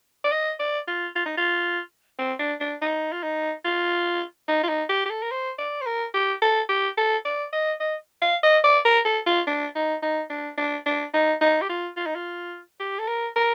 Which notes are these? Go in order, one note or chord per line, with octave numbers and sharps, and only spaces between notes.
D5
D#5
D5
F4
F4
D#4
F4
C4
D4
D4
D#4
F4
D#4
F4
D#4
F4
D#4
G4
G4
A4
A#4
C5
D5
C5
A#4
G4
A4
G4
A4
D5
D#5
D#5
F5
D#5
D5
A#4
A4
F4
D4
D#4
D#4
D4
D4
D4
D#4
D#4
G4
F4
F4
D#4
F4
G4
A4
A#4
A#4